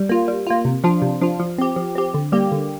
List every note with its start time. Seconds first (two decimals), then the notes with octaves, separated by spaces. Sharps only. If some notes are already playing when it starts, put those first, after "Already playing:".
Already playing: G3
0.09 A#3 F4
0.28 G3
0.47 A#3 F4
0.65 C3
0.84 F3 D4 F4
1.02 C3
1.21 F3 D4 F4
1.40 F3
1.58 C4 G4
1.76 F3
1.95 C4 G4
2.14 D3
2.32 G3 A#3 G4
2.52 D3